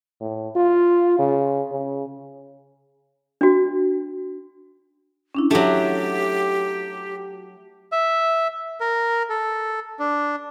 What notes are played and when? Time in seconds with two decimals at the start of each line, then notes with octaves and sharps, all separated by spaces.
0.21 A2
0.56 F4
1.19 C#3
1.72 C#3
3.41 D4 F#4
5.35 C#4 D4 E4
5.51 F#3 A3 G4
7.92 E5
8.80 A#4
9.30 A4
9.99 D4